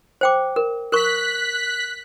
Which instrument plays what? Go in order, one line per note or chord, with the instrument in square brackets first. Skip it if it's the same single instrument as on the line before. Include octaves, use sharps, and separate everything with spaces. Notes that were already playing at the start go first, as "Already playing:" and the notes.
[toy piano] C5 G5 D6
A#4
[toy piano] A#4 C#6 [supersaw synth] F#6 B6